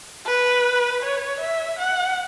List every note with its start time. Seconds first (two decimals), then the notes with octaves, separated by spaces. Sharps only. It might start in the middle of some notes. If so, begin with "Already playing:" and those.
0.26 B4
1.03 C#5
1.40 E5
1.79 F#5